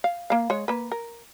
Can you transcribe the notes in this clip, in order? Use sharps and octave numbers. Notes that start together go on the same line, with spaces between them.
F5
A#3 F5
G#3 C#5
A#3 B4
A#4